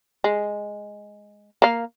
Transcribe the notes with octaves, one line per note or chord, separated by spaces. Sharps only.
G#3
A#3 F5